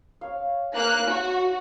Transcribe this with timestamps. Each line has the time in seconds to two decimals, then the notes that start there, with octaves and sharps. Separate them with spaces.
0.21 C#5 F5
0.74 A#3 F#6
1.09 F#4